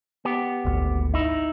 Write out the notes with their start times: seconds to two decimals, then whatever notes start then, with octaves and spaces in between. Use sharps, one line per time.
0.25 B3 G4
0.65 G#1 D2
1.14 D#4 E4